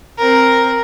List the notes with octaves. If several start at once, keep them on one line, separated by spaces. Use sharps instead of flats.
C4 A#4